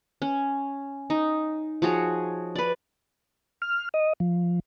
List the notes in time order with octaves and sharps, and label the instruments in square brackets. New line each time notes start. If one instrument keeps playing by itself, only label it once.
[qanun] C#4
D#4
F3 F#4 G#4 C#5
B4 D5
[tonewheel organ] F6
D#5
F3